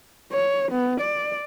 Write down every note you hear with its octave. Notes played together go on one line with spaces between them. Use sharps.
C#5
B3
D5